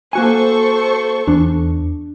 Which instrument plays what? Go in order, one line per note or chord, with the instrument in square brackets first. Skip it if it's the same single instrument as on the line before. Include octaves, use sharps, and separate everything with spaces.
[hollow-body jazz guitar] A#3 F#4 G#5 [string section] A4 C5 C#6
[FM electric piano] E2 [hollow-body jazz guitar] D4